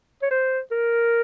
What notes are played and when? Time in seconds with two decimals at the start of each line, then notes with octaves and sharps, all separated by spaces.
0.22 C#5
0.31 C5
0.71 A#4